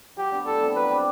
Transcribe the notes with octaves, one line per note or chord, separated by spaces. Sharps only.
F#3 G4
B3 D4
A2 A4
G3 C4 E4
F#3 B4
C4 G4 C5